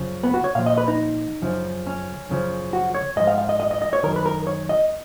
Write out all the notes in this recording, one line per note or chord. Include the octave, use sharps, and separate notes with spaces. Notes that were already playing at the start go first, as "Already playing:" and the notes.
Already playing: F#2 C#3 F3
B3
F#4
C#5
A#2 F3 F5
D#5
B4
D#4
F#2 C#3 F3
C#4
F#2 C#3 F3
F#4
C#5
G#2 F3 D#5
F5
F5
D#5
D#5
D#5
D#5
C#5
F#2 D#3 A#4
B4
A#4
C#5
D#5